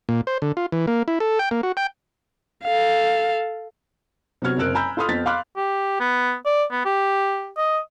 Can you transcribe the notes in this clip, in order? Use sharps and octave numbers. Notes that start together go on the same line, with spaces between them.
A#2
C5
D3
F4
E3
A#3
E4
A4
G5
A#3
F#4
G5
A4 F5
C3 F#3 B3 F#4 F6 G#6
F#1 C4 A#4 E6 F#6 D7
G#5 A#5 B5 E6 G6
F4 A4 B5 C6 D#6 F6
F2 B3 A6 B6
F5 B5 C6 D6 F6 F#6
G4
B3
D5
B3
G4
D#5